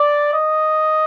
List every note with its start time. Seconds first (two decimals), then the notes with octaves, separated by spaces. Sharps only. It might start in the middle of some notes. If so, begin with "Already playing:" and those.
Already playing: D5
0.32 D#5